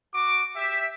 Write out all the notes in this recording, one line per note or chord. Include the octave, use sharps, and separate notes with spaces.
F#4 D6
G4 E5